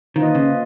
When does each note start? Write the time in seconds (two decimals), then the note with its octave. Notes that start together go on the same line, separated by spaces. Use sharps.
0.15 D#3 F3 A#3 F4 B4 D#5
0.35 C#3